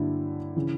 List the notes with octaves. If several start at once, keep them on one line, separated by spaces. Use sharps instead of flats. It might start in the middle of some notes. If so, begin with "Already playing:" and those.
Already playing: G2 D3 F#3 A#3 E4
C#3 E3